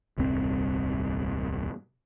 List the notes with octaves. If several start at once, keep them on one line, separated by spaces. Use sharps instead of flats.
D#1 C2 G2 C4